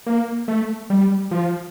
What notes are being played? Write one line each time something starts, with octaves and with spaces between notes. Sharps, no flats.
A#3
A3
G3
F3